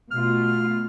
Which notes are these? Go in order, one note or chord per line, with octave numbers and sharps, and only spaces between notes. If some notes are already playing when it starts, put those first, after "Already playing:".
B2 A3 F4 F6